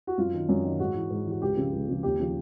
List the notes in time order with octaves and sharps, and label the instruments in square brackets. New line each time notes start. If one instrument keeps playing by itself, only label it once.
[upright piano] F#4
F#2 F4
D#3
F#2
D#3
G#2 F#4
E3
G#2
E3
F#4
C#2 G4
C#3 F3
C#2
C#3 F3
D#2 G4
C#3 F3